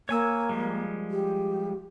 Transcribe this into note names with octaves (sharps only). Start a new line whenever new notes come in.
A#3 C#5 G#5 E6
F3 G3 G#3
G4